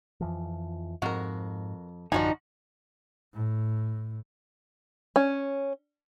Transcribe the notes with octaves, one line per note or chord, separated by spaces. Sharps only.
F2 E3 F3
F2 G#2 F#4 A#4
A1 F#2 D3 F3 D4 D#4 F#4 G#5
A2
C#4